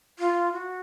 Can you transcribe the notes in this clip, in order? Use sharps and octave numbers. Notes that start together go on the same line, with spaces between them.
F4
F#4